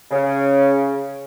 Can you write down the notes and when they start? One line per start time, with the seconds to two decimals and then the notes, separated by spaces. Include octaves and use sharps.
0.11 C#3